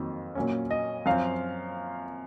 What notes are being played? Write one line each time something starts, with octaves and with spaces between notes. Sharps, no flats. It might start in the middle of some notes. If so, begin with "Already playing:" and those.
Already playing: F2 D#3 F#3 A#3
A#2 F#3 A#3 C#4
D#5
F#2 F3 C4 F5